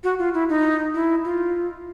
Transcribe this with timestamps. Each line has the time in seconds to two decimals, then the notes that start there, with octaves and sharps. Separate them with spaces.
0.04 F#4
0.19 F4
0.34 E4
0.49 D#4
0.94 E4
1.25 F4